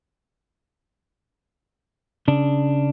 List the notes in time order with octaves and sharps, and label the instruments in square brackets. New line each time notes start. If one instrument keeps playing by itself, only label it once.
[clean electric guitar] C#3 D4